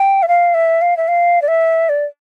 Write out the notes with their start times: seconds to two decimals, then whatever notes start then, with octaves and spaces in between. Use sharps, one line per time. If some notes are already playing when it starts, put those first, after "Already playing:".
Already playing: G5
0.22 E5
0.28 F5
0.54 E5
0.81 F5
0.97 E5
1.08 F5
1.42 D5
1.48 E5
1.89 D5